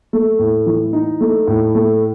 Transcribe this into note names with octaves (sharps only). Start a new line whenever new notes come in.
A3
A2
E3
D#4
A3
A2
A3